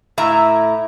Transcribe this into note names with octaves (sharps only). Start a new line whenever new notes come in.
A2 E4 E5 A#5